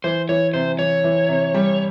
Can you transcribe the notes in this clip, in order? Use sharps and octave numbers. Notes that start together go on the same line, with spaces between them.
E3 C5
E3 C#5
C3 C5
E3 C#5
E3
C3
G3